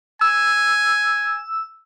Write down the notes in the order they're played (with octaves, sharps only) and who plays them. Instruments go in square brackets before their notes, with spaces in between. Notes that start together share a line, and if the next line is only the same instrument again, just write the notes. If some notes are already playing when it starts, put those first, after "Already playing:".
[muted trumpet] G#5 [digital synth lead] E6